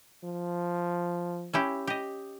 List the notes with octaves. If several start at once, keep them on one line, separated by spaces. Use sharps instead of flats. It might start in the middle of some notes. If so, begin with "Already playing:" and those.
F3
C#4 E4 G4
G4 D#5